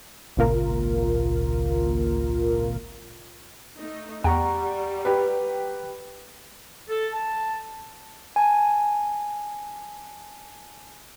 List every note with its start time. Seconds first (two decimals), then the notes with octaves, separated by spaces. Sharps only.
0.37 G#1 C#2 A#2 F4 A#4
3.81 A3 D#4
4.24 E2 G3 F#5 G5 A#5 C#6
5.05 G4 B4
6.90 A4
7.14 A5
8.36 G#5 A5